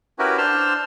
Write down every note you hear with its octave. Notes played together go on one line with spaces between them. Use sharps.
C#4 E4 F#4 G4 A#4 B4
D4 C5 A5 C6 E6 F6